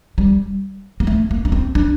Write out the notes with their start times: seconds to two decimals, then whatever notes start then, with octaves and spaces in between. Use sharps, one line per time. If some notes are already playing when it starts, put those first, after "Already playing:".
0.18 G3
1.00 A#3
1.07 A3
1.31 A#3
1.45 D4
1.52 C4
1.75 D4